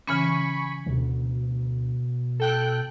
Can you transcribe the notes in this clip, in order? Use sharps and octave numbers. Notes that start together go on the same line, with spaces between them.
C#3 E3 C#4 G#5 B5 C#6
D2 B2
A4 G5 F#6